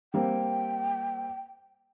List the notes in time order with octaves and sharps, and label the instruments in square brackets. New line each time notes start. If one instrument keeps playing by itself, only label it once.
[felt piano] G3 A#3 C4 [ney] G5